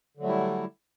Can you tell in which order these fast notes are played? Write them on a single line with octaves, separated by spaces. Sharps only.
D3 F#3 A3 G3 E4